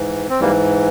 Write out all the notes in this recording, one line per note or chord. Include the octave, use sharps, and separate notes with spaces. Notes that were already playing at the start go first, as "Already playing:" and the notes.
Already playing: G#2 E3
C4
G#2 E3 G3 A#3